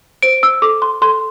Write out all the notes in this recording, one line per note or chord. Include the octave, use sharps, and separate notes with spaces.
C5 D7
E6
A4 D6
C6
A4 C6